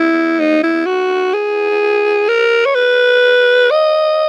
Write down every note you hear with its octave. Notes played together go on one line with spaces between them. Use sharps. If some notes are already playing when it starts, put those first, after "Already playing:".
Already playing: E4
D#4
E4
F#4
G#4
A#4
C#5
B4
D#5